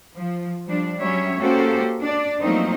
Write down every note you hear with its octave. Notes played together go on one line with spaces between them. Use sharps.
F3
F3 G3 D4
F#3 G3 C#4 C#5 E5
A#3 C#4 F#4 G4 A4 C5
D4 D5
F3 F#3 A3 A#3 C4 D#4